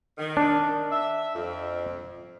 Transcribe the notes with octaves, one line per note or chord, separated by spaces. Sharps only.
D#3
D4
E5
F2